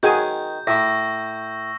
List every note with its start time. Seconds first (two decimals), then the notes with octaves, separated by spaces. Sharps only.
0.03 D#3 F#4 G#4 G#5 G6
0.67 A2 E5 C#6 E6 A#6